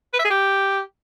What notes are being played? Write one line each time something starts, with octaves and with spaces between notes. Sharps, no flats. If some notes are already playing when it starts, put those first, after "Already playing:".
B4
E5
G#4
G4